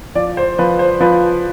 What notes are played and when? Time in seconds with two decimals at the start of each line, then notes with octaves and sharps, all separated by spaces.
0.15 F3 D5
0.37 C5
0.59 F3 B4
0.79 C5
1.00 F3 B4